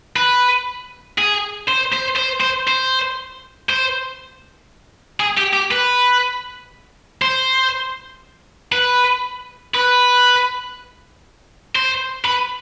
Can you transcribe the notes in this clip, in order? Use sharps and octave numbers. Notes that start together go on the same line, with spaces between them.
B4
G#4
C5
C5
C5
C5
C5
C5
G#4
G4
G4
B4
C5
B4
B4
C5
B4